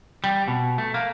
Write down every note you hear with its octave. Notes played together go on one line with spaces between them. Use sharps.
G3
B2
A3
A#3